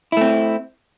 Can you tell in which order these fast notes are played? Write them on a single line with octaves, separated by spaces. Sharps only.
E4 A3 C4